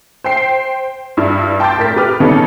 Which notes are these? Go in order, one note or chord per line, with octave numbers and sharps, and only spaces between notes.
C5 G5 C7
G2 D4 E4
G5 A5 C6 D6 G6 A6
A2 A#4 B6
G4 B4 D6 F6
C#3 B3 D#4 A4 C#5